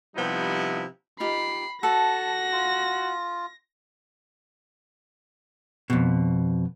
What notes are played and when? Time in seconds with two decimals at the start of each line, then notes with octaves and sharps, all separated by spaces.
0.15 C3 F3 G3 B3 D#4 E4
1.20 D#4 F4 G4 B5 C7
1.83 F#4 A4 A5 A#6
2.52 F4
5.90 F2 B2